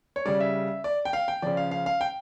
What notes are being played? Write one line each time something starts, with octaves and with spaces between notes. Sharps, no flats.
C#5
C#3 G3 D5
E5
D5
G5
F5
G5
C#3 F3 D5
F5
F5
F5
G5